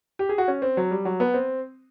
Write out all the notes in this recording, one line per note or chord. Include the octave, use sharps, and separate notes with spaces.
G4
G#4
F#4
C#4
C4
F#3
G3
F#3
B3
C4